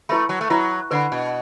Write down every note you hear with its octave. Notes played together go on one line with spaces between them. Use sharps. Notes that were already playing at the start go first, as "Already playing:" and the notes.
A3 E4 B4 E5 B5
F#3
A3
F#3 E4 B4 E5 B5
D3 B4 F#5 B5
B2